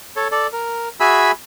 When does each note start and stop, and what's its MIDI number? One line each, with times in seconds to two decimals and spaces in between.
0.16 0.28 69
0.16 0.28 73
0.32 0.47 69
0.32 0.47 74
0.53 0.89 70
1.00 1.31 66
1.00 1.31 68
1.00 1.31 76
1.00 1.31 80
1.00 1.31 83
1.00 1.31 88